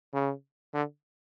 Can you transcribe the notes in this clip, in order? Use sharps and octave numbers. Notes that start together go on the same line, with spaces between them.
C#3
D3